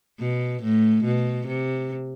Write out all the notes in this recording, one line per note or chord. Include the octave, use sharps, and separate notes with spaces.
B2
A2
B2
C3